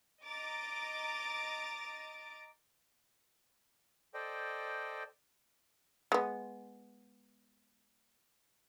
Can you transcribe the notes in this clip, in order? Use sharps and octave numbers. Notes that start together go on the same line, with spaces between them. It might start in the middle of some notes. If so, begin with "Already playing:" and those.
D#5 A#5 D6 A6
A4 C5 D5 D#5 G5
G#3 B3